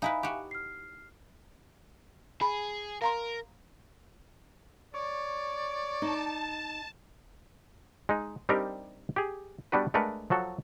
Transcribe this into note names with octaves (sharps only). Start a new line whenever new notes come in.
D#4 E4 B4 E5 F5 G#5
F#4 G4
F6 C7
G#4 B5
A#4 F5 A#5 C6
C#5 D5
D#4 A5
G#3 D#4
G3 C4 D4 D#4 G4 A#4
G4 G#4
G3 B3 D4 F#4 B4
G#3 A3 D4 A#4 B4 F#5
F3 F#3 F#4 A4